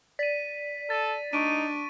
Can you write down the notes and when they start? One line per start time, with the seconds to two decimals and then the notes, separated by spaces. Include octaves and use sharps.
0.19 D5 B6 D#7
0.90 A4 A6 D#7
1.33 D4 D#4 C#6 D7 D#7